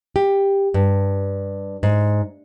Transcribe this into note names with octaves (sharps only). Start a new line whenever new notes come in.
G4
G2
G#2